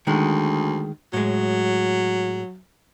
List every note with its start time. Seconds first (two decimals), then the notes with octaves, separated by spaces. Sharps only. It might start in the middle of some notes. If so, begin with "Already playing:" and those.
0.07 D2 D#3 G#3
1.13 A2 F#3 G#3